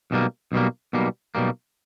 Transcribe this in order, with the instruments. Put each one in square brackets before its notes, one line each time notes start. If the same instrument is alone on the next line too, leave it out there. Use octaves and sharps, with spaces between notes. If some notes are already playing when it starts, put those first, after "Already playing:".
[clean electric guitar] B1 B2 G3 A#3
B1 B2 G3 A#3
B1 B2 G3 A#3
B1 B2 G3 A#3